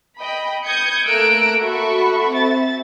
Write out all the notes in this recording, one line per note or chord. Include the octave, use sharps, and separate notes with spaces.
D#5 G5 B5
D#6 G6 G#6 C#7
A3 A#3 A#5 E6 F#6 D7
F#4 A4 E5 B5 C#6
C4 E5 A6